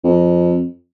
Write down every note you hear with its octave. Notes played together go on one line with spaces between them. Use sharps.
F2